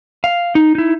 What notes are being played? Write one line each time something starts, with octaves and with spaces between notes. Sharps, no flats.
F5
D#4
D#4 E4